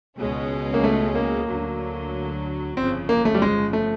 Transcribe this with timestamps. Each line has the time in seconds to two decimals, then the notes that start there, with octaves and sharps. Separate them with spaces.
0.19 C#2 B2 G#3 C#4
0.74 A#3
0.84 A3
1.15 A#3
1.48 D2 D3 F#3
2.77 G1 F2 C#3 F3 C4
3.09 A#3
3.25 A3
3.34 G3
3.42 G#3
3.73 A3